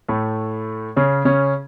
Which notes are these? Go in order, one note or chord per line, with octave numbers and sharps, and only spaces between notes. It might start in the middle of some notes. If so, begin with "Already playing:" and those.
A2 A3
C#3 C#4
C#3 C#4